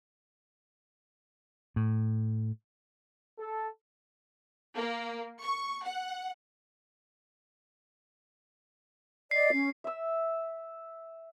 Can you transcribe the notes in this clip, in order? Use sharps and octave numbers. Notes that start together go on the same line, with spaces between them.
A2
A4
A#3
C#6
F#5
D5 D#5 C7
C#4
E5 E6